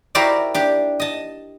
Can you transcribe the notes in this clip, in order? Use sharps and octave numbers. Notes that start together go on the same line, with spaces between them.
E4 F#4 G4 A#4 C5 D5
D4 G4
D#5 A5